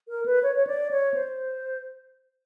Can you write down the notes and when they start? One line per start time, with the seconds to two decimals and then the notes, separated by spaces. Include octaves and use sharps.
0.08 A#4
0.26 B4
0.43 C#5
0.55 C#5
0.67 D5
0.91 C#5
1.14 C5